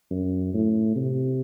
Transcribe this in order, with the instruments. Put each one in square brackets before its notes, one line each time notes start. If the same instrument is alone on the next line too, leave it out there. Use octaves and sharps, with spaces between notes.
[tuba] F#2
A2
C3